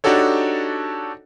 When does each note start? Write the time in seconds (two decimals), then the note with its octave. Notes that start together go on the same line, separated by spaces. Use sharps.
0.04 D4 D#4 F#4 G4 A4 C#5